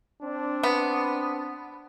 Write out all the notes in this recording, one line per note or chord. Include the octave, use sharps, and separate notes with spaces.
C4 D4
B3